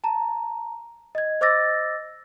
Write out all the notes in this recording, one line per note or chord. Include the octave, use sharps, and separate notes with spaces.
A5 A#5
D#5 G#6
C5 D#5 D6 E6 A6 A#6